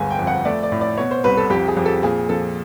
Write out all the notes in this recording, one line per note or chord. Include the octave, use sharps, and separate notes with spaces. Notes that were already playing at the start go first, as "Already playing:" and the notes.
Already playing: G1 D2 G#3 G#5
G5
F2
F#5
A3 D5
D5
A2
D5
B2 C#5
C5
C2 B4
A4
F2 G4
G#4
F2
A4
A#2 G#4
F3 A4